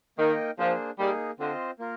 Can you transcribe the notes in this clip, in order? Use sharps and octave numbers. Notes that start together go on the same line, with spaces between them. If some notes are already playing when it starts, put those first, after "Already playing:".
D#3 A#3 D#4 A#4 D#5 G5
F3 A#3 D4 G#4 C5
G3 A#3 D#4 G#4
D3 C4 F4 C5 D#5
A#3 F4 A#4